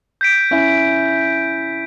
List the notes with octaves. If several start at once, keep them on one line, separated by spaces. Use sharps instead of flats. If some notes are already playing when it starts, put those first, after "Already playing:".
G6 B6 D7
C#4 E4